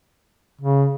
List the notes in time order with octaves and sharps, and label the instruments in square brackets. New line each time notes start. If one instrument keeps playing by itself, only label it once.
[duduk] C#3